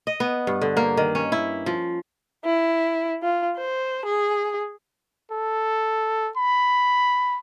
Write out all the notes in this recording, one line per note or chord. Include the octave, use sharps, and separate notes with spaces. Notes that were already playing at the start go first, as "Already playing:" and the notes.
D#5
B3
G2
D3
A#3
D#3
C#4
E4
F3
E4
F4
C5
G#4
A4
B5